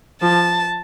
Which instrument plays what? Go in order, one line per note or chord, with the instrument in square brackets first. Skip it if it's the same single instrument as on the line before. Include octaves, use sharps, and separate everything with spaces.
[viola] F3 [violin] A5